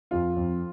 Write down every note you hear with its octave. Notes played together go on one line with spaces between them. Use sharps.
F2 F4
F2